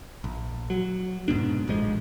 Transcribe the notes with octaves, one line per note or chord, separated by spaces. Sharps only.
A#1
F#3
F1 G#2 B2 D4
A1 A#2 F3 G#3